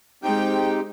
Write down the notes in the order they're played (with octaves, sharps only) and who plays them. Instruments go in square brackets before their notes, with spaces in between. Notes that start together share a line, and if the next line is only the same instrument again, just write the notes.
[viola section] G#3 G5 [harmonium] C4 D#4 G4